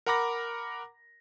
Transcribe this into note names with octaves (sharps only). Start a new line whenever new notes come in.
A#4 F#5 A#5 B5 D6 A#6